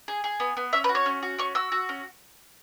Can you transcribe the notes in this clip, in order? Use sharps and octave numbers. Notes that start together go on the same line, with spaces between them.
G#4
G#4
B3
B3
C#4 E5
B4
F#4
C#5
C#4
F#4
C#4 C#6
F#4 E6
F#4
C#4